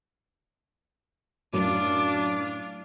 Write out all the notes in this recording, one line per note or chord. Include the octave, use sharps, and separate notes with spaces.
F#2 A2 D4 F4 D6